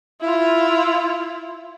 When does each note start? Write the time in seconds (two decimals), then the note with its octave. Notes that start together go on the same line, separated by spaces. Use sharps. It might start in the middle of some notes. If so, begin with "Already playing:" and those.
0.21 E4 F4